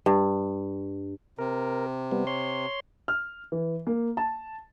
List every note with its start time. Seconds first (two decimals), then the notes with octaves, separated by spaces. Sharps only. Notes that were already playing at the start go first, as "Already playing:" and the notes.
0.06 G2
1.39 C3 A#4
2.12 G3 B3
2.27 C#5 C6
3.08 F6
3.52 E3
3.87 A#3
4.17 A5